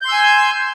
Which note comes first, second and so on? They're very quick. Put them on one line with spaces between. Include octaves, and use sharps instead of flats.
G6 C6 E6 G#5